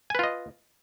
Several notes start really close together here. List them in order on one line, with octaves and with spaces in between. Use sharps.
G#5 B4 F4 D#5